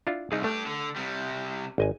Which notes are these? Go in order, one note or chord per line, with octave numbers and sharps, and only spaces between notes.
D4 E4 F4
C2 D#4 G#4
A3 D4 G4
D3
C3 G3
G#1 D#5 G#5